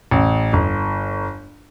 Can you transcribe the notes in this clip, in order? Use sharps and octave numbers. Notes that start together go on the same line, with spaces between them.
A1
G1